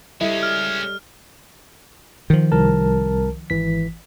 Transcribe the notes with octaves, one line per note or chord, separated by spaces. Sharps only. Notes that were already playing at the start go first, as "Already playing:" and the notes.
G3 G#3 C#4 E4 A4 D#5
F6
D#3 F3
C2 A#4 A5
G#1 E3 B6